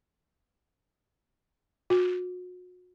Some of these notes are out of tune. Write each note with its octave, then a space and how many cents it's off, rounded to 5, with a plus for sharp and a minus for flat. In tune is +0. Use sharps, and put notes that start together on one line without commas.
F#4 -35